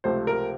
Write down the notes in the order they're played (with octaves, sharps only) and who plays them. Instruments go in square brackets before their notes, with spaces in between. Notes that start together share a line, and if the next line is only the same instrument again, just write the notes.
[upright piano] C#2 C3 F3 A3 C4 C5
A#4